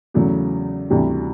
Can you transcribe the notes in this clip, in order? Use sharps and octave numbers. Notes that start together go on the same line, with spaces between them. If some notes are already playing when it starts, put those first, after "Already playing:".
E2 C#3 F#3 A3
D2 C3 E3 G3